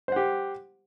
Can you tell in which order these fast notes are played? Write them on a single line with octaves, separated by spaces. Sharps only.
C5 F#5 G4